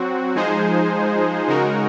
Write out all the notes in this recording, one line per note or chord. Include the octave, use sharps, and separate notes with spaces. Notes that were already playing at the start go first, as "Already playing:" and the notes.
Already playing: F#3 C4 F#4
F3 G#3 D#4 G#4 C5
C#3 G#3 D#4 F#4 A#4